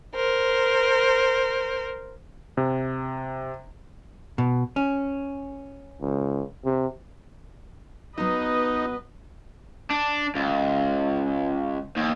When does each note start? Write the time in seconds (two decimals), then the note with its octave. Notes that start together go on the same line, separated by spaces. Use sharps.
0.15 A#4 C5
2.57 C3
4.38 B2
4.76 C#4
6.01 C#2
6.65 C3
8.18 F#3 B3 D#4 B4 D#5
9.91 D4
10.36 C#2
11.96 D#2